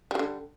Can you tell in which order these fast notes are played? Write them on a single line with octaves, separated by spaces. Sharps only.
G3 F#3 D3